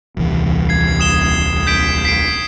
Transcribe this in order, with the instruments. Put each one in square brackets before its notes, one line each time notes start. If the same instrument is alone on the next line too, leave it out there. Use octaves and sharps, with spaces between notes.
[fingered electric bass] D#1 C2 E3
[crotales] G#6 C7
D#6 E7 G7
G6 B6 D7
B6 C7 D7